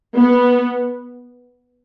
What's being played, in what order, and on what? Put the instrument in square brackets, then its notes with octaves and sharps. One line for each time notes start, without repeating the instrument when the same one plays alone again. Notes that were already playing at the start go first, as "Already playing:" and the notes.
[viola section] B3